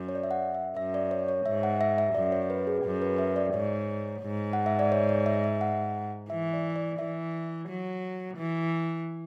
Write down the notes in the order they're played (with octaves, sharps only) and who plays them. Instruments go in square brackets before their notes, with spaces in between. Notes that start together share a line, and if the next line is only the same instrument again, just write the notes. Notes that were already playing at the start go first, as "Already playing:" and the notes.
Already playing: [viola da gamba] F#2
[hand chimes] C#5
D5
E5
F#5
E5
[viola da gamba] F#2 [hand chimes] E5
[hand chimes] D5
C#5
C#5
[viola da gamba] G#2 [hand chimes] E5
[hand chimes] F#5
E5
E5
[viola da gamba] F#2 [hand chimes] D5
[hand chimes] C#5
B4
G#4
[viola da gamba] F#2 [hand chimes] G#4
[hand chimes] B4
E5
D5
[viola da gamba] G#2 [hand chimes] C#5
[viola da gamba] G#2
[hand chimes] F#5
E5
D5
C#5
D5
E5
E5
F#5
[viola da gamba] E3 [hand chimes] E5
[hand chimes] D5
D5
[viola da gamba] E3 [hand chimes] E5
[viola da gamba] F#3
E3